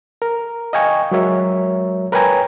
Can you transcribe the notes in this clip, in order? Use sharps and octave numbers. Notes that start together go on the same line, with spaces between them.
A#4
D#5 F5 G5 G#5 C#6
F#3 G#3 F#4 A#4 C#5 E5
A#4 B4 C#5 G5 G#5 A#5